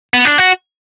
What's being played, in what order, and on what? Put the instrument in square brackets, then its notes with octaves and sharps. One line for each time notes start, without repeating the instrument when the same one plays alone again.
[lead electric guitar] B3
D4
F#4